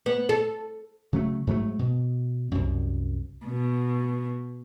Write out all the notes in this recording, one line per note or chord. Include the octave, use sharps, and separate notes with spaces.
B3
A4
C#3 F#3 A3
G#2 F#3 A3
B2
C2 F#2
B2